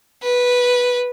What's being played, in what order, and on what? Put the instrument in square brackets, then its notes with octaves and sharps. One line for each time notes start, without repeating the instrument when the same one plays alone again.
[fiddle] B4